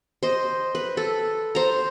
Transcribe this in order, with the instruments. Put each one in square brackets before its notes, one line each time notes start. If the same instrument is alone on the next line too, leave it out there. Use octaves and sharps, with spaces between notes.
[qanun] C5 D#5
B4
A4
C5 A#5